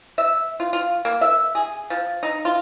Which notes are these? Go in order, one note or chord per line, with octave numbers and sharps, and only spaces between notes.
E5
F4
F4
A#3
E5
G#4
F3
D#4
F4